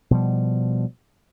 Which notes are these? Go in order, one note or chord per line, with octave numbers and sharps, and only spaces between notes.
B2 F3 G3